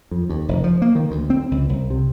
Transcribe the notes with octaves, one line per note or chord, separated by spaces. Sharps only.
F2
D#2
F1
F3
A#3
D#3
D2
C4
C#2
C2
C3